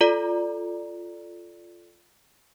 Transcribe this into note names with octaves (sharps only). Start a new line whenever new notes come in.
F4 A4 D5 A#5